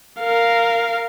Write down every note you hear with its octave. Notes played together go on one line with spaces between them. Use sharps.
A#4 F5